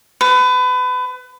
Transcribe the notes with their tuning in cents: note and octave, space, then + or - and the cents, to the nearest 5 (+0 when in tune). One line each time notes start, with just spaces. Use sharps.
B4 +30